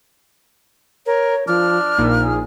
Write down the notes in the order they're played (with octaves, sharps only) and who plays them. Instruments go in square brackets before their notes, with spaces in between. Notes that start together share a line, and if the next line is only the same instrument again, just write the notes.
[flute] A#4 [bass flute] C#5
[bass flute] F3 [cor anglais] D4 [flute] F6
[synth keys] A#1 A#2 [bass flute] D#4
[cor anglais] G#4